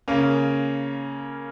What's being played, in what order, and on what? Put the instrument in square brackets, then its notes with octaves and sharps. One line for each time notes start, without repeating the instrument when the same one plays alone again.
[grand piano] C#3 A#3 C#4